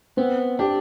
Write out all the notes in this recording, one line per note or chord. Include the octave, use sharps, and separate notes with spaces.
B3 C4
D4 G4